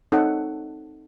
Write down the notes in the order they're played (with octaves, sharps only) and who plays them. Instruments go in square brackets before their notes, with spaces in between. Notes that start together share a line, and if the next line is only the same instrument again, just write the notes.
[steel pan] C4 D#4 A4 C#5 F#5